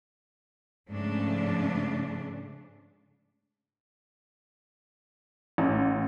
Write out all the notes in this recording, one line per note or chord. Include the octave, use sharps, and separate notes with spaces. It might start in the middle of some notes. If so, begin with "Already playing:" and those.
G#2 C#3 F3 A3 D4
A1